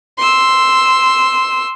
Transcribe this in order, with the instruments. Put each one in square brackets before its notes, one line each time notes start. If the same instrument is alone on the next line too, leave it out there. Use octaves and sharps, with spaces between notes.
[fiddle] C6 E6